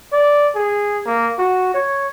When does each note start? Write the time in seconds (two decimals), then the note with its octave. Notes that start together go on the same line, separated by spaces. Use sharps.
0.13 D5
0.55 G#4
1.06 A#3
1.39 F#4
1.74 C#5